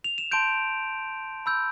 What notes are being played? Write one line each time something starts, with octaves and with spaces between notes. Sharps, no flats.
F7
E7
A5 C6 G6 D7
B5 E6 G6